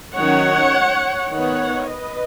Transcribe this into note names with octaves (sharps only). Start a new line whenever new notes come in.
D#3 F#3 C#4 C#5 F#5
D#3 B3 C#5 F#5
B4 D#5